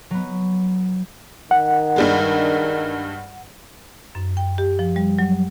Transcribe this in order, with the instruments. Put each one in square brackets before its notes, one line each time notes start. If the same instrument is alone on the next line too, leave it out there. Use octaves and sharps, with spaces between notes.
[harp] F#3 B3
[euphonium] D#3 [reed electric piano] F#5
[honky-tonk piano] G2 G3 G#3
[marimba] F#2
G5
G4
F3
G3
F#3